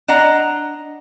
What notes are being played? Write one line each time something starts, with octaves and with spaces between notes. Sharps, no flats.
D4 D#5 F#5 A#5